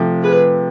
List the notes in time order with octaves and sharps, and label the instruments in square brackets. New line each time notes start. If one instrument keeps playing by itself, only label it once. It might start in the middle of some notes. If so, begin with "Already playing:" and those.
Already playing: [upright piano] C3 F3 A3
[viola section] G#4 B4